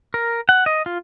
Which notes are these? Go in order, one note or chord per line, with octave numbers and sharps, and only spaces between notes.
A#4
F#5
D#5
F4